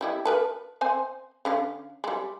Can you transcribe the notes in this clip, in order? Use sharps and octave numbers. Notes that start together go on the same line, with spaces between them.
G3 E4 D#5
A#4 B4 A5
C4 C5 G#5
D3 C#4 F5
G3 G#3